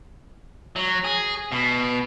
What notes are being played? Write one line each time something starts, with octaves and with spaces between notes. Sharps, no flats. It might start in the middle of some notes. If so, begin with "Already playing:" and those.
F#3
G#4
B2